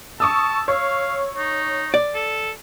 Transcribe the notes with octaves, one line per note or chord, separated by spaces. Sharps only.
A5 C#6 D#6 E6
C#5 F5
D#4
D5
A4